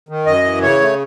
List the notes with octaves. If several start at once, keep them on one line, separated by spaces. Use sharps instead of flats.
D#3
F#2 D#5
E3
C#3 C#5
A3